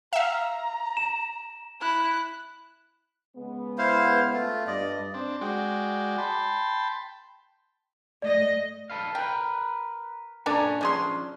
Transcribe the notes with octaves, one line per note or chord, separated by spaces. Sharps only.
E5 F5 A#5
E7
E4 F#6
C#3 G#3 B3
E4 C5 F5
A3 F4
G2 D5 D#5
C4 D4
G#3 F#4 D5 G5
G5 A5 B5 C6
A3 D5 D#5
A4 B4 F5
A#4 B4 G5
A#2 C#4 D4 A4 G#5 A#5
F3 A3 C#4 D4 G#4 C6